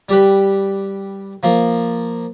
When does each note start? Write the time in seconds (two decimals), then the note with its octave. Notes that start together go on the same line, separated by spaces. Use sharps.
0.09 G3 G4 B4
1.43 F3 A#3